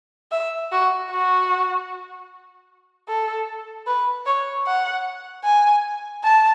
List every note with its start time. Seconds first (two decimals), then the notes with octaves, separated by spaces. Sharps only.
0.32 E5
0.72 F#4
1.11 F#4
3.09 A4
3.87 B4
4.26 C#5
4.67 F#5
5.44 G#5
6.24 A5